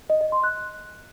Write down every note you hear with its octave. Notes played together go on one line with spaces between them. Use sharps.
D#5
D#5
C6
F#6